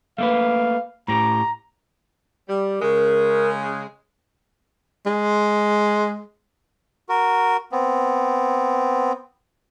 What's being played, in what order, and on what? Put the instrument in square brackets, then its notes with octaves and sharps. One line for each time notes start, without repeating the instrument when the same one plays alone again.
[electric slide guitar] A3 A#3 B4 [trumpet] F5
[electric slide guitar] A2 G4 [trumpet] A#5
[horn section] G3
[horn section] C#3 G#3 [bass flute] A#4
[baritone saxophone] G#3
[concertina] F#4 A#4
B3 C4